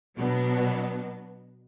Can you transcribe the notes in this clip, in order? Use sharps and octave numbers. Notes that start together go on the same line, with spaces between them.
B2 F#3 B3 D4